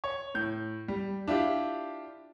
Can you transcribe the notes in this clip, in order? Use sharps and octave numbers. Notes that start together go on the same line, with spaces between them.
C#5
A2 G6
G3
D4 E4 F4 G4